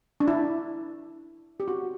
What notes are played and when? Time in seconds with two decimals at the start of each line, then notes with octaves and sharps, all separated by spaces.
0.20 D4
0.28 E4
1.60 G4
1.68 F#4